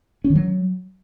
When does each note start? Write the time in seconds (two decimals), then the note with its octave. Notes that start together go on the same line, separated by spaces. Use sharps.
0.24 C#4
0.30 D#3
0.36 F#3